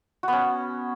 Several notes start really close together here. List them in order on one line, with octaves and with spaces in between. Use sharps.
F#4 B3 C#4